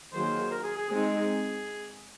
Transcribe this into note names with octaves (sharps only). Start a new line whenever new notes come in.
D#3 F#3 A#3 F4 G#4 C5
A#4
G#4
G#4
G#3 C4 D#4 G#4